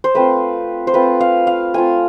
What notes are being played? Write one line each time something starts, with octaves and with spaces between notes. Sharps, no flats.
C5
A3 C4 F4 B4
C5
A3 C4 F4 B4
F5
F5
A3 C4 F4 G#5